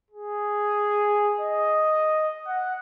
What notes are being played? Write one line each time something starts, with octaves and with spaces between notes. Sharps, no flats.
G#4
D#5
F#5